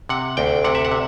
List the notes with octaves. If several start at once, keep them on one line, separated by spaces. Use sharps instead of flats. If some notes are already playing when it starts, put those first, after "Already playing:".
C3 F#5
D2 G5
C3 F#5
E5
F#5
C3